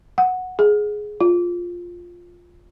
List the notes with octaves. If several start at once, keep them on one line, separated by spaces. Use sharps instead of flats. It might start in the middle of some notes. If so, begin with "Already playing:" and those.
F#5
G#4
F4